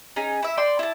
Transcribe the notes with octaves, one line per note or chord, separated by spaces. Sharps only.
C#4 D#4 G#4
E4 E5
D5 G5 C6
E4 A5